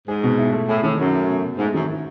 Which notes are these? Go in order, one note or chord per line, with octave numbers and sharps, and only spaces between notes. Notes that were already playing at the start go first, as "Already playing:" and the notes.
G#2 G#4
B2
E4
A3
A2 G#4
A2 D#3
F#2 C#4
A3
B2
B2
G#2 A3
F#2 D#3
E4